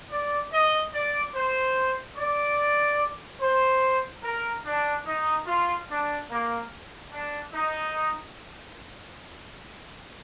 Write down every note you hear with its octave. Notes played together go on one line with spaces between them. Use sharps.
D5
D#5
D5
C5
D5
C5
A#4
D4
D#4
F4
D4
A#3
D4
D#4